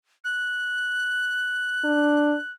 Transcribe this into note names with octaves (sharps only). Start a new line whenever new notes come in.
F#6
D4